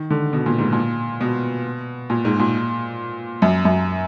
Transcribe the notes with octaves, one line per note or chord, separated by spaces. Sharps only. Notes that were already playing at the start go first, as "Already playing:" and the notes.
Already playing: D#3
D3
B2
A#2
G#2
A#2
B2
A#2
G#2
A#2
F#2
F#2